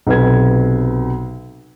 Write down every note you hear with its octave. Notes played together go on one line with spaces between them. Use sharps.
B1 C3 B4 G#6